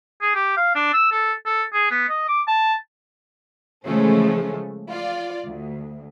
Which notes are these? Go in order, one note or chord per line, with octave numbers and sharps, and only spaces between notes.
G#4
G4
F5
D4
E6
A4
A4
G#4
B3
D#5
D6
A5
C#3 E3 F3 G#3 A3 C#4
F4 D5
D2